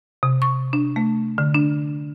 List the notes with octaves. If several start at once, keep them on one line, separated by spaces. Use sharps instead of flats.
C3
C#6
D4
A3
D3
D4